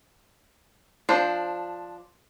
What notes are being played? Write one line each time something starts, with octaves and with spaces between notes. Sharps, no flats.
F3 D4 C5